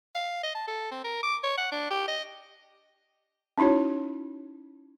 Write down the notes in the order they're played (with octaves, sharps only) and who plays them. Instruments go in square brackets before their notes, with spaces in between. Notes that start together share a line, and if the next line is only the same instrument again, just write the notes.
[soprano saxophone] F5
D#5
A5
A4
C4
A#4
D6
C#5
F#5
D4
G4
D#5
[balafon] C#4 D#4 E4 F#4 C#5